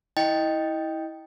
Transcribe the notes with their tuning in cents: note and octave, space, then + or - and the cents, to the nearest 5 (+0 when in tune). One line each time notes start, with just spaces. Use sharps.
E4 -25 D#5 +0 G5 +0